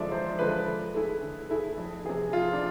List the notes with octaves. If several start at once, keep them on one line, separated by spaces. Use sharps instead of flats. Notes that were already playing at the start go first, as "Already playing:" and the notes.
Already playing: E2 D3 F3 G#3 D5 E5
E2 C5
D3 F3 G#3 B4
D3
A3 E4 G#4
D3
A3 E4 G#4
F2
C3 E3 G#4
F2 F4
D4